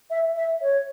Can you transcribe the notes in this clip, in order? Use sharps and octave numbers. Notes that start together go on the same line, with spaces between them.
E5
E5
C#5